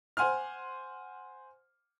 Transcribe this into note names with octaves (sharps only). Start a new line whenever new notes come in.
C5 F#5 G#5 C6 F6